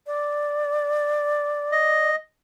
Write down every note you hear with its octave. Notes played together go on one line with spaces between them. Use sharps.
D5
D#5